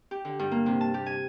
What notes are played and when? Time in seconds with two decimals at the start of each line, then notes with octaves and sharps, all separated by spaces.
0.11 G4
0.25 D3
0.39 G2
0.51 A#3
0.66 C3
0.81 A5
0.94 G4
1.06 G#5